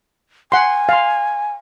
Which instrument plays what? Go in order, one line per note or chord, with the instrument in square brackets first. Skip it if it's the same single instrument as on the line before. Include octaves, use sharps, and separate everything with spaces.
[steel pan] F#5 C6 [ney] G#5
[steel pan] F5 C6